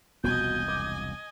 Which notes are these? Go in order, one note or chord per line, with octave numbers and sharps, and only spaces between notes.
E1 C2 B2 F3 D#5 G#5 G6
D6